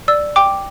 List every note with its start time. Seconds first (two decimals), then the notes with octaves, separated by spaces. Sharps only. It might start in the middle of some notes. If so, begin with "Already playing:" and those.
0.08 D5 E6
0.36 G5 D6